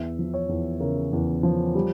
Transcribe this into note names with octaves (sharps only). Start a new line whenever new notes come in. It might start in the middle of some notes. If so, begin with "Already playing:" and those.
Already playing: E2 E5
F3
C#5
E2
C#3 A#4
E2
F3
G3